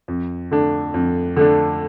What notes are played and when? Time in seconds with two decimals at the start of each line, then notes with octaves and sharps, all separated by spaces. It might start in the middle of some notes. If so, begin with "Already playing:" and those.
0.08 F2
0.51 D3 A3 D4
0.94 F2
1.37 D3 A3 D4